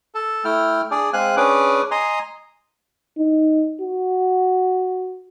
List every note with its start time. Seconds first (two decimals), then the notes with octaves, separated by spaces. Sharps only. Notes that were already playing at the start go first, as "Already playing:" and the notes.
0.15 A4
0.44 A3 E4 G5 F6
0.91 D4 G#4 D5
1.13 G#3 C4 F5 G#5 F#6
1.37 C#4 D4 G#4 B4 D6
1.91 D#5 G#5 A#5 C6
3.18 D#4
3.81 F#4